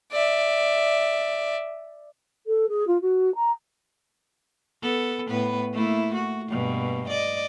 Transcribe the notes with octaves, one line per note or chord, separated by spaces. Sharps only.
D5 E5
A4
G#4
F4
F#4
A#5
B3 A4
A2 B3 B4
A3 A#3 E4
F#4
G2 B2 A#3
D5 D#5